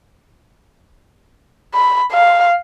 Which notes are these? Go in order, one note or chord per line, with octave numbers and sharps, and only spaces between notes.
B5
F5